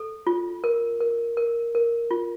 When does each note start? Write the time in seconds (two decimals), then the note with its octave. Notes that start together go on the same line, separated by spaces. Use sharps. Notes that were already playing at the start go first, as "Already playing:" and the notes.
Already playing: A4
0.27 F4
0.64 A#4
1.01 A#4
1.37 A#4
1.75 A#4
2.11 F4